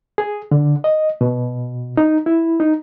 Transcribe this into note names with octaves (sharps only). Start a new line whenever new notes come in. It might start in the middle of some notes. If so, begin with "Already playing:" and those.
G#4
D3
D#5
B2
D#4
E4
D#4